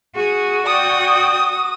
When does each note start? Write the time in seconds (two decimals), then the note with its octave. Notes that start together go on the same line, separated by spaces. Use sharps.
0.15 F#4 G#4 D#6
0.66 D5 G5 D#6